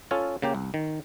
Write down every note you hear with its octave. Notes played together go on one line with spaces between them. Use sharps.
C#4 F4 A4 C#5
C#3 A#3 G4
C2
D#3